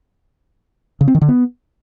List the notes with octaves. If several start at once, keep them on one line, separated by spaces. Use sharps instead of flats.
C#3
C4
D#3
D3
B3